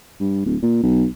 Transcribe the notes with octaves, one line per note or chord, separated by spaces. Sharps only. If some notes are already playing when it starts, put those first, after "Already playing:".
G2
D1
A#2
B1